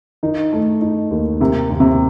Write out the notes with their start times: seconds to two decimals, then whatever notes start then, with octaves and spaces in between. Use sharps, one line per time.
0.23 D#3 D#4
0.53 A3
0.81 D#4
1.11 D#2
1.40 C3 D#3
1.70 D#2
1.80 C3